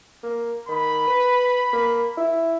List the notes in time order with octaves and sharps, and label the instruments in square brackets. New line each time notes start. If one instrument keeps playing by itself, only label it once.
[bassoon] A#3
[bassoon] D#3 [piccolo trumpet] B5
[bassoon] B4
A#3
E4